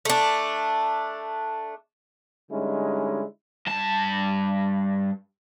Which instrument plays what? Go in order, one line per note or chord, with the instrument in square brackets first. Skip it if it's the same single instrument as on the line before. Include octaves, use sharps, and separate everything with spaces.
[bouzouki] A3 D4
[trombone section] D3 G3 G#3 C#4 D#4 E4
[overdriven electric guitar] G2 A5